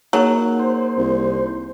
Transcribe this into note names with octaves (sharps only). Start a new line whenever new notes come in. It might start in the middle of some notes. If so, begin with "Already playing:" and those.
F#3 A#3 D#4 G#4
C5
C2